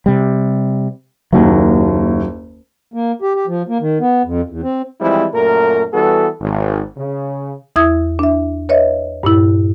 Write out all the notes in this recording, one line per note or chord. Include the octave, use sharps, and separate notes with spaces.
C3 G3
F#1 D#2 F#3
A#3
G4
G4
F3
A#3
D#3
B3
F2
E2
C4
E3 F3 G3 G#3 C4 E4
F#2 A#2 A3 A#4
E3 G3 B3 F#4 A4
G#1
C#3
E2 E4 E5 D#6 G#6
D4 E5
B4 C#5 D#5 E5
G2 A#2 E4